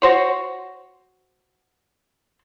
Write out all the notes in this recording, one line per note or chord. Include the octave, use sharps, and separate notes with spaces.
F#4 C5 C#5